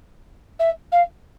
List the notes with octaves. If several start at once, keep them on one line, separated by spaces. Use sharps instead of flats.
E5
F5